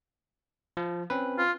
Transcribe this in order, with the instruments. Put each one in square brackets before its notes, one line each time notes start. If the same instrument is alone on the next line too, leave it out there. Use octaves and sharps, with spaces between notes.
[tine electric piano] F3
C4 C#4 B4
[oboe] F4